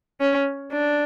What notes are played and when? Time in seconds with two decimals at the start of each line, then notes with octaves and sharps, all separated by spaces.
0.21 C#4
0.72 D4